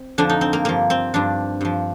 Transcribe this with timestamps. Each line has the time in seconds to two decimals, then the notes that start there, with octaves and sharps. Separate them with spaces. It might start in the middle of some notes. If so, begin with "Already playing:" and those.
Already playing: C4
0.18 F2 D3 F3 D4
0.29 D#4
0.41 C4
0.53 A#3
0.65 G2 F3 A#3
0.90 C4
1.14 G2 F3 D4
1.61 G2 F3